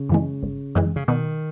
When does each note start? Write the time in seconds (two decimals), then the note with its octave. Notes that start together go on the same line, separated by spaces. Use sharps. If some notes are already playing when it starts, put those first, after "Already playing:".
Already playing: C#3
0.09 F#2 E3 G#3
0.43 G#1
0.75 F#2 E3 G#3
0.96 C#3
1.08 B2 D#3